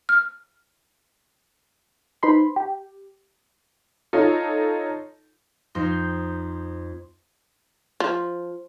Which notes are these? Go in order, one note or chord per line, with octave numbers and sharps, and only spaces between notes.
F6
D#4 B4 C5 B5 C6
G4
D#4 F4 A4 C#5
F2 D#4 C5 C6 G6
F3